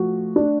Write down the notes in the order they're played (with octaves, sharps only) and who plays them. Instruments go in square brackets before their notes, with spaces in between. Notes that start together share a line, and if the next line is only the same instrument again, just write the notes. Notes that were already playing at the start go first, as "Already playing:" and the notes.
Already playing: [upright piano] F3 F#4 [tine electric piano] A3
[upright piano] D4